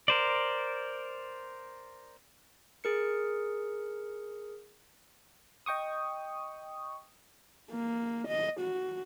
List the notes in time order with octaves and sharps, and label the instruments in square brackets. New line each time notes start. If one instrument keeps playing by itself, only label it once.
[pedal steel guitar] A#4 C5 D5
[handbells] G#4 A#4 C#7
[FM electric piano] D#5 G5 C#6 D#6
[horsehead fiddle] A#3
D#5
F#4